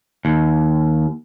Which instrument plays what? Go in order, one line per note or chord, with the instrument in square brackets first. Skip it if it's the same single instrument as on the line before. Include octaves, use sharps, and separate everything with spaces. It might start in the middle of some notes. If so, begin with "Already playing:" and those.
[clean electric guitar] D#2